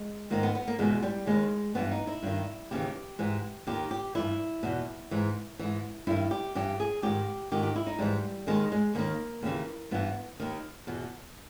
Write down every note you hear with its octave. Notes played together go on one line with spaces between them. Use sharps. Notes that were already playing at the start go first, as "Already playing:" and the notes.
Already playing: G#3
G#2 D#3 A#3
B3
B3
A#3
E2 B2 G#3
G3
D#2 D#3 G#3
G2 E3 B3
D#4
E4
G2 D#3
D#2 C#3 E3 G4
G#2 E3
D#2 D#3 G4
G4
G2 E3 E4
E2 B2
G#2 E3
G#2 E3
G2 D#3 E4
G4
G2 E3 G4
G#4
G#2 D#3 G4
G#2 D#3 G4
G4
E4
D#4
G#2 E3 G3
D#2 D#3 G#3
G#3
D#2 D#3 A#3
D#2 C#3 E3
G2 E3 B3
D#2 D#3
E2 B2